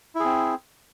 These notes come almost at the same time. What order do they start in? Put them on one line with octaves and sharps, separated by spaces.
E4 G#4 C4